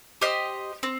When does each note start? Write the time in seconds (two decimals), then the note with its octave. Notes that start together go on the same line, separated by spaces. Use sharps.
0.21 G4 C5 D#5
0.83 C4